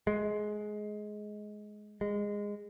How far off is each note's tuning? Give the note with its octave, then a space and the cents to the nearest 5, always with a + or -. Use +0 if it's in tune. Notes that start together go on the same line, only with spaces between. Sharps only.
G#3 +15
G#3 -15